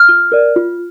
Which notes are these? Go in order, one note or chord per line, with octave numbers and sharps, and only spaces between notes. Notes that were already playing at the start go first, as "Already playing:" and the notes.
Already playing: F6
F4
A#4 D5
F4